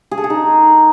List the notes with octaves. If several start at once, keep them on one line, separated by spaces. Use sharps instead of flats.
G#4
A4
G#4
D#4